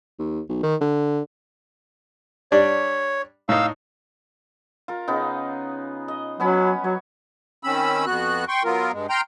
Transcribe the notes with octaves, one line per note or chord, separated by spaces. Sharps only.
D#2
B1
D#3
D3
G3 D4 C#5
A2 D#4 F5 E6
F4 A#4
C#3 B3 D#4
D#5
F#3 B3 C#4 B5
F#3 C#5
D#3 C4 C#4 B5 E6
F2 B3 F#4 F#6
G5 C6 C#6
F#3 B3 F4 A#4
G2 G#3
G5 A#5 C6 F6 G6